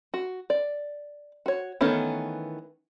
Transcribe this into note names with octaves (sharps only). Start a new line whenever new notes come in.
F#4
D5
F#4 C#5
D#3 E3 A3 B3 C#4